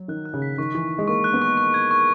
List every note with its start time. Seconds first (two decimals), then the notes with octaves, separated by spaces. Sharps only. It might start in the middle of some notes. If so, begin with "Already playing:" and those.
Already playing: F#3
0.08 D#3 F#6
0.26 F#6
0.34 C#3
0.42 B6
0.58 D#3 C#6
0.75 E3 C#6
0.92 C#6
0.98 G#3
1.08 A#3 C#6
1.24 F#6
1.33 B3
1.42 C#6
1.57 C#6
1.74 G#6
1.91 C#6